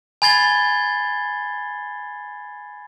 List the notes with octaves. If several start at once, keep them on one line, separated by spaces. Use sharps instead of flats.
G#5 B5 G#6 A6 C7 G7